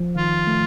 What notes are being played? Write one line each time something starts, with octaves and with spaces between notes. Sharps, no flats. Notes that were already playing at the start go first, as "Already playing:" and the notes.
Already playing: F3
D#3 F4
A3